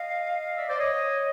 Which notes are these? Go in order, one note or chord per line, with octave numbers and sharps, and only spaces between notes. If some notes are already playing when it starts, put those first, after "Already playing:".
Already playing: D#5 F5
D5 E5
C5 D5
C#5 D#5